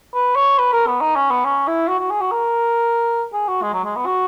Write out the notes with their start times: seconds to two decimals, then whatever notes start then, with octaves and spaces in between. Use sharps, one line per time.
0.14 B4
0.36 C#5
0.58 B4
0.72 A#4
0.87 B3
1.01 D#4
1.16 C#4
1.30 B3
1.45 C#4
1.67 E4
1.88 F#4
1.99 F#4
2.10 G#4
2.21 F#4
2.31 A#4
3.33 G#4
3.48 F#4
3.62 G#3
3.73 F#3
3.85 G#3
3.96 B3
4.06 F#4